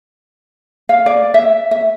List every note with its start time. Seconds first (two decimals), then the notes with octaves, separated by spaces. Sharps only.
0.89 F5
1.06 D5
1.34 E5
1.71 E5